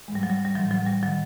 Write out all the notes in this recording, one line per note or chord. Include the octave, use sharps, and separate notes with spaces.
G#2 E3 G3 G#3
F#3
G3
G3
A2 E3 F#3
F#3
G3
D#3 F#3